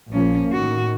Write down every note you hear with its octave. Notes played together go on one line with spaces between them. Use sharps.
A#1 F3 A#3 C#4
A2 D#3 F#4